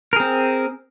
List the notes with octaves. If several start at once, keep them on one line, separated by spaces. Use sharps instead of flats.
C4 G#4 A#4